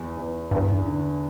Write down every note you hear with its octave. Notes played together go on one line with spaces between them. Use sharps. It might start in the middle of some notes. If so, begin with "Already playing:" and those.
Already playing: E2
E2
E2 G2
D3